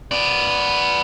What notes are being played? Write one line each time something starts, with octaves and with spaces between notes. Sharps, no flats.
B3 D5